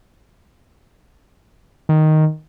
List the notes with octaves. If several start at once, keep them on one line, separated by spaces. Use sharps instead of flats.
D#3